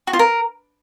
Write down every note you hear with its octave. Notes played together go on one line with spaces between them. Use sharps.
F#4
F4
A#4